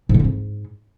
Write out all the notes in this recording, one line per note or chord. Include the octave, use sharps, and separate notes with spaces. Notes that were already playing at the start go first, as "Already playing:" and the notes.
G#2
D3
C4
G#2